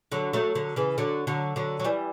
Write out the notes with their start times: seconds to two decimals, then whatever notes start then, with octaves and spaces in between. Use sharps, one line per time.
0.12 D3 F#3
0.33 F#3 A3
0.55 D3 F#3
0.76 C#3 E3
0.98 D3 F#3
1.27 D3 F#3
1.56 D3 F#3
1.79 F#3
1.85 E3 G3